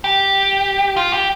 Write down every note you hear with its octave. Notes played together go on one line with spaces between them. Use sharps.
G4
F4
G4